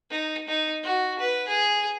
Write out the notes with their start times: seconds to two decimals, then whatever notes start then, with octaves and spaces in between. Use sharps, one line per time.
0.10 D#4
0.48 D#4
0.83 F#4
1.19 B4
1.48 G#4